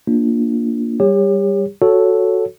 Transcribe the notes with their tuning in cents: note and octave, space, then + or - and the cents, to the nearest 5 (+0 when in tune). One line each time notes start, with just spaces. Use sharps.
A#3 +0 D4 +0 F4 +0
G3 +0 G4 +35 C#5 +0
F#4 -5 A4 +0 C#5 +0